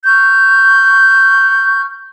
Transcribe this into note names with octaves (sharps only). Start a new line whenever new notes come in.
C#6 F6 G6